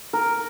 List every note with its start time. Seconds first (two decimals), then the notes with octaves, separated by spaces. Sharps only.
0.13 A#4